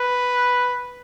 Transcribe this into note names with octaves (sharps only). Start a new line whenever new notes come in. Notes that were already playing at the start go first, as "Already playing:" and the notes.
Already playing: B4